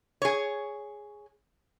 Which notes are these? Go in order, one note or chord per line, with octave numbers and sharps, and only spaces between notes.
G#4 C#5